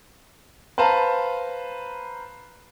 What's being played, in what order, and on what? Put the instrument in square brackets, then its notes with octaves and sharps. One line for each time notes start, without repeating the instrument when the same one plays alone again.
[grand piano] B4 C5 F5 A5 A#5